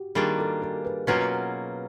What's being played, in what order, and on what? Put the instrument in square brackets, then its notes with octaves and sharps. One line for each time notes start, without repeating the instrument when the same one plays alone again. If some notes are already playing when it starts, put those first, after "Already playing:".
Already playing: [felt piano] F#4 G4
[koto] D#3 G3 A#3 D4 F4 [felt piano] G#4
[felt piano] A4
A#4
B4
[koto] B2 F#3 A#3 C#4 F4 [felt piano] B4